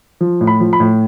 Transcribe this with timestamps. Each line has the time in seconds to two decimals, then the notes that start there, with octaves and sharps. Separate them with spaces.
0.21 F3
0.41 A2
0.47 B5
0.60 F3
0.73 B5
0.80 A2